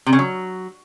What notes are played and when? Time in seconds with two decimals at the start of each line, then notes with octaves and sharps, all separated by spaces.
0.06 C3
0.13 C#3
0.19 F#3